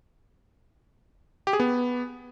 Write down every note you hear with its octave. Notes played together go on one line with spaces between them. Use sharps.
G4
G#4
B3